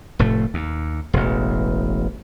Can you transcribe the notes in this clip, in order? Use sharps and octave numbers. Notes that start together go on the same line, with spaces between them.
F1 A2 A3
D#2
E1 A1